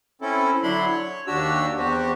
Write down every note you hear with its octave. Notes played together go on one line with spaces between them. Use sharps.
C4 C#4 E4 A4
D3 F#3 D4 E4 B5 C6
C#5
D#2 D4 F#4 G4 E6
E2 C4 F#4 G4